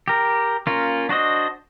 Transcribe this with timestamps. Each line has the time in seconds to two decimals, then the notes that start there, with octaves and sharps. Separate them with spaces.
0.08 G4 A#4
0.67 A#3 C#4 F4
1.09 D4 F#4 C5 D#5